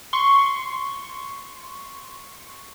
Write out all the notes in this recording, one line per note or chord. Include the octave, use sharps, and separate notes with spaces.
C6 C#6